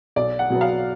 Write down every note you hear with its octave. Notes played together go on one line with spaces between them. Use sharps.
B1 D5
F#5
B2 F#3 B3
F5